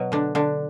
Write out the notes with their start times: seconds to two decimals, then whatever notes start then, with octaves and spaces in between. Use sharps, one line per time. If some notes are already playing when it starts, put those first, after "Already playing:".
Already playing: B2 F#3
0.12 D3 D4
0.35 D3 D4